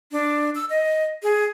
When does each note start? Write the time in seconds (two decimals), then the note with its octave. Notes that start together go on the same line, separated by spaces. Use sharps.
0.12 D4
0.55 E6
0.70 D#5
1.23 G#4